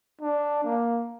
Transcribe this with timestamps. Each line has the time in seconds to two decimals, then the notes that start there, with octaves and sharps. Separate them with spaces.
0.21 D4
0.64 A#3